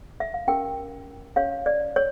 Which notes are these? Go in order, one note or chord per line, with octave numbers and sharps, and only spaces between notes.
E5
F5
C#4 G4 A#4 G5
C#4 G4 C#5 F5
D5
C#5